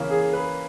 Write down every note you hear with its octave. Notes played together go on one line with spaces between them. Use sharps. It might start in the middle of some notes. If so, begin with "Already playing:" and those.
Already playing: C#3 E3 A#3 C#4
G#4
B4